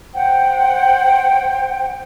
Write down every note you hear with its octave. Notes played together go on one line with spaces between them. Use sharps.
C5 F#5 G5